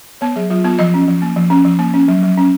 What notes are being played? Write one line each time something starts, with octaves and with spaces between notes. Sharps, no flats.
B3 C#5
F#3 G#4
F#3 F4
B3 F4
F3 D#5
C#4
F3
A#3
F3
C#4
F3
A#3
C#4
F#3
F#3
C#4